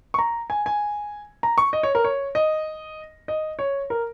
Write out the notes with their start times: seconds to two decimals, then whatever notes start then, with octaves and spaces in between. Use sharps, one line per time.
0.14 C#6
0.19 A#5
0.50 G#5
0.66 G#5
1.43 A#5
1.58 C#6
1.73 D#5
1.83 C#5
1.95 A#4
2.04 C#5
2.35 D#5
3.28 D#5
3.59 C#5
3.90 A#4